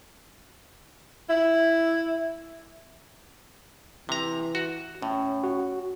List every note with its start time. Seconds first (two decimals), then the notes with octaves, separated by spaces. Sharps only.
1.29 E4
4.09 C3 E3 A#5
4.55 F#4
5.02 A2 C#4
5.44 F#4